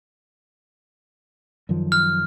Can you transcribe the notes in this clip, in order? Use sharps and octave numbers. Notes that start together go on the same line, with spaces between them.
F#2 D#3 F3
F6